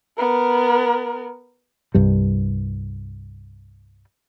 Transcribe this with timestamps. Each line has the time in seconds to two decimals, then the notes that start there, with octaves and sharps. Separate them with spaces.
0.18 B3 A#4
1.95 C2 G2 G3